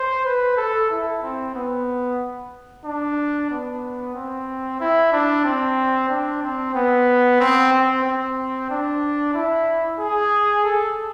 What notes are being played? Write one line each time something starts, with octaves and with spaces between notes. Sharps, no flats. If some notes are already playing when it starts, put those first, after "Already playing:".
Already playing: C5
B4
A4
E4
C4
B3
D4
B3
C4
E4
D4
C4
D4
C4
B3
C4
C4
C4
D4
E4
G#4
A4